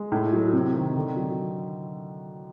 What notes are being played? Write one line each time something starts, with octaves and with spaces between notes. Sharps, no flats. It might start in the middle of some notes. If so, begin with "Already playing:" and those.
Already playing: G#3
A2
F#3
C3
D#3
D3
F#3